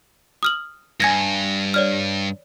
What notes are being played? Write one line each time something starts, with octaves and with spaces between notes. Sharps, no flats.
D#6 F6 F#7
G2 G#5 G#6 A#6
C#5 D5 F6